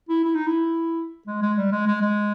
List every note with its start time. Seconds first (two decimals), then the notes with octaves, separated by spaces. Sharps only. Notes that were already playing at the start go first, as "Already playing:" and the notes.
0.09 E4
0.24 E4
0.35 D#4
0.47 E4
1.27 G#3
1.42 G#3
1.58 G3
1.72 G#3
1.87 G#3
2.02 G#3